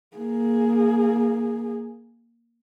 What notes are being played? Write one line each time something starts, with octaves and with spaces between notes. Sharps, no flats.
A#3 G#4